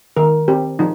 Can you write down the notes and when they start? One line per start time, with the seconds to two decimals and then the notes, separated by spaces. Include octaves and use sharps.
0.17 D#3 A#4
0.48 C4 G4
0.79 F3 D#4